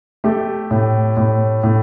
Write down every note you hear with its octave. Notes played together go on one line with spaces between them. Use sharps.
A3 G4
A2
A2
A2